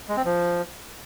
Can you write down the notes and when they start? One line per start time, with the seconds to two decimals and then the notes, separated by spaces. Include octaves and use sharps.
0.09 G#3
0.17 C4
0.25 F3